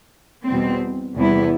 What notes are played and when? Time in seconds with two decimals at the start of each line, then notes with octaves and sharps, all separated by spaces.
0.47 E2 B2 G3 C4
1.16 E2 C3 G3 B3 E4